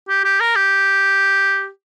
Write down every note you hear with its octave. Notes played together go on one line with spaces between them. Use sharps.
G4
G4
A#4
G4